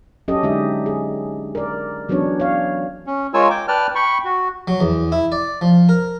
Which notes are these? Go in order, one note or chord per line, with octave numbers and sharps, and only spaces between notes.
F#3 C#4 G4 A4 D#5
D3 G#3 D4 D#4 G4 E5
G#4
A#4 D5
E3 F#3 B3 C#4 D4 C#5
C#5 F5
C#4
G#3 F4 A#4 C#5 G#5 E6
G5 D6
B4 D5 G5 A5 F6
G5 B5 C#6
F#4
F#3
E2
E4
D5
F3
A#4